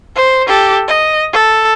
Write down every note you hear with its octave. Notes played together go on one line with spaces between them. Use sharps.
C5
G4 A4
D#5
A4